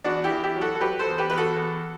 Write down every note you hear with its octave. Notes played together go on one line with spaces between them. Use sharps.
E2 D4 F#4
E4 G4
E2
E4 G4
F#3
F#4 A4
A4
F#3 G4 B4
A4 C5
E2
G4 B4
E2 B4
F#4 A4
E2